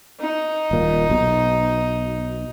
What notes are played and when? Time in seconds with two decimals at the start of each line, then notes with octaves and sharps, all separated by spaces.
0.20 D#4
0.71 D#1 A#2
1.10 B1